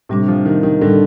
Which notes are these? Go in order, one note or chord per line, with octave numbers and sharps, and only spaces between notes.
A2 C3 G3 D4
F3
D#3
D#3
A2 D3 G3 D4